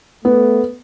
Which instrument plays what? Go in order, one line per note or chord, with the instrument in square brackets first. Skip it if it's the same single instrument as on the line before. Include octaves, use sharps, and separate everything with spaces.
[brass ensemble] A3 [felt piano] B3